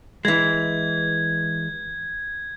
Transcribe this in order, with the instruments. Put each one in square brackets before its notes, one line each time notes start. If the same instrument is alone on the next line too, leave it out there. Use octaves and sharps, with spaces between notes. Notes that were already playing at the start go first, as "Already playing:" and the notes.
[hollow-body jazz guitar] E3 G#3 [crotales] G#6